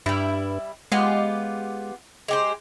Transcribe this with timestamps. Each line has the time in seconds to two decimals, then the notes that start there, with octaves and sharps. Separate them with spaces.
0.06 G2 G3 E4
0.92 G#3 B3 F4 G4
2.28 G#3 G4 C5